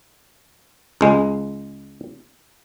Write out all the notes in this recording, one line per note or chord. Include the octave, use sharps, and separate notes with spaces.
C#2 G#3